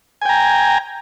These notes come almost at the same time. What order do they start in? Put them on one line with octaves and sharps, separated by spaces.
G#5 G5 A#5